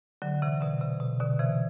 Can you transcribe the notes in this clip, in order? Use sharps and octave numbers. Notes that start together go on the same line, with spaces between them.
D3 F#3
C3 E3
B2 D3
C3
B2
B2 D3
C3 E3